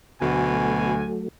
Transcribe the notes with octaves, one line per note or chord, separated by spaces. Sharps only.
D2 B2 F#3 A3 G#5